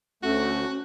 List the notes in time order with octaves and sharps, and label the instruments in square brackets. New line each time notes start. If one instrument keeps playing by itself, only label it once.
[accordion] D2 A3 [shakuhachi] C#4 [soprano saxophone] F#4